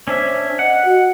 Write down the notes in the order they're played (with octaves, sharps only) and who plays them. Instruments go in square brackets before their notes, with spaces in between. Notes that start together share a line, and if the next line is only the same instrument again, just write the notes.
[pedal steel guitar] C#4 D4 E5 [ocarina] C5
[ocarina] D#5 [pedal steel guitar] F#5
[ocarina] F#4